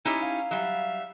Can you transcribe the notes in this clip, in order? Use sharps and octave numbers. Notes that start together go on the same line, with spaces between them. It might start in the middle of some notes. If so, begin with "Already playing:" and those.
C#4 D#4 E4 G4
F5
F#3 G3 E5